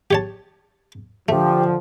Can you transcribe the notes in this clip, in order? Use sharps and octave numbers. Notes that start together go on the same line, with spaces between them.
G4 C#5 A5
D3 F3 A3 G4